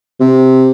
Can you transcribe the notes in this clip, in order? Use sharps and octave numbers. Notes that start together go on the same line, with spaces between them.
C3